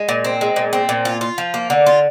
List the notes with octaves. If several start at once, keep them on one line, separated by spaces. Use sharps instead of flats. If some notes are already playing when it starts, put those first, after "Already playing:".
Already playing: G#3
A#2
C4
G#3
A#2
C4
A#2
F4
F4
F3
A#3
D3
F4